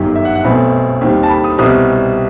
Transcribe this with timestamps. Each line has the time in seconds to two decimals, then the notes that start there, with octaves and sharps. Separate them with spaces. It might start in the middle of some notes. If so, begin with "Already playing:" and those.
Already playing: G1 F#2 D#3 G4
0.15 E5
0.25 F#5
0.35 F#5
0.44 B1 B2 A3 C4 B5
1.01 D#2 D#3 G3 C4
1.23 A5
1.29 B5
1.44 D#6
1.58 C2 B2 G3 C4 D#6